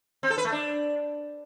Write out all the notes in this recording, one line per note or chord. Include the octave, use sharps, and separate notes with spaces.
C4
A4
B4
A3
D4